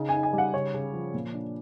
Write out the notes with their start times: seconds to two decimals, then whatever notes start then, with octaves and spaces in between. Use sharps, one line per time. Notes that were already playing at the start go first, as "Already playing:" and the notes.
Already playing: C#3 D#4
0.09 G#5
0.13 D#4
0.23 G#5
0.33 G3
0.38 F#5
0.54 C#3 C#5
0.74 C#3
0.93 F3
1.14 A#2
1.34 D4